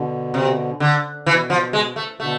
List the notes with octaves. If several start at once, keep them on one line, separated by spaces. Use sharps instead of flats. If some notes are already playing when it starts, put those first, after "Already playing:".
Already playing: B2 D3
C3
D3
B2 E3
F3
G#3
A3
B2 D3 A3